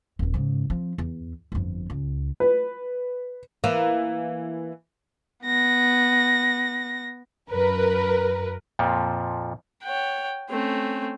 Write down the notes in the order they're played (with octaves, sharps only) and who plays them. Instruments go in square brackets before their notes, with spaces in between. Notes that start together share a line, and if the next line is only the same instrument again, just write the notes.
[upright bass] D#1 E2
G#2 C#3
F3 C4
E2
G1 F2
C#2
[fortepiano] B4
[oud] E3 A#3
[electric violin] B3 A#6
[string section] F#2 A#4 B4
[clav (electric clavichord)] F2 A#2 F3
[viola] C#5 F#5 [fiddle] G5
[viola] A3 C#4 [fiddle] C4